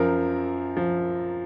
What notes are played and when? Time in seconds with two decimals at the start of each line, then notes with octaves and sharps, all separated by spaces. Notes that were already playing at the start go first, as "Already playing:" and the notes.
Already playing: F#2 F3 A#4
0.77 F3